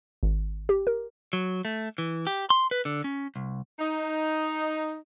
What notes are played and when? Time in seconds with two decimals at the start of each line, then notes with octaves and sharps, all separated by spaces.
0.23 G#1
0.69 G4
0.87 A#4
1.33 F#3
1.65 A3
1.98 E3
2.27 G4
2.50 C6
2.71 B4
2.85 D3
3.04 C#4
3.36 C2
3.79 D#4